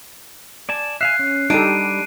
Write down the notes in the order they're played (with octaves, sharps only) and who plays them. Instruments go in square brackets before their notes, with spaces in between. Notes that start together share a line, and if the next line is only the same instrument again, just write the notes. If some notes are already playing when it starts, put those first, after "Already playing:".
[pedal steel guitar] D5 G#5 A5
[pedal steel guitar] E5 F5 G#5 [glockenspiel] F#6 C7
[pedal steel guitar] C#4
[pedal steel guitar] G3 [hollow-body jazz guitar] D4 G4 [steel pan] D#4 A4 [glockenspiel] D7 D#7